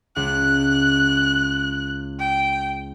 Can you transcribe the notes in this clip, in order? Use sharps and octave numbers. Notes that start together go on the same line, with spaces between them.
C#2 F#6
G5